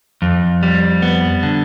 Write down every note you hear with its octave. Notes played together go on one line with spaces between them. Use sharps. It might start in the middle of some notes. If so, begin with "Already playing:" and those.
F2
G3
B3
D3